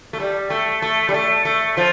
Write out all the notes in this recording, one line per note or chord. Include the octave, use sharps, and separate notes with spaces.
A3
G3
A3
A3
G3
A3
A3
F3